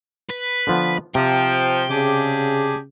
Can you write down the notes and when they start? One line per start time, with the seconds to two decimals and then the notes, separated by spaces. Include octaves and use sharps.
0.30 B4
0.67 D3 F3 B3
1.15 C3 F3 G5
1.90 C#3 D4 G4 G#4